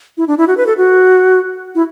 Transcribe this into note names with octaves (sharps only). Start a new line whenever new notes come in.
E4
D4
E4
F#4
B4
A4
F#4
E4